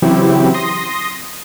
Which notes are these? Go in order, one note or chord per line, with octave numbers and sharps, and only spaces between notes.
C#3 E3 F#3 C4 E4 G4
C6 D#6 A#6